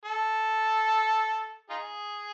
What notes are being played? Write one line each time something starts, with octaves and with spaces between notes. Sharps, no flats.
A4
D#4 F4 G#4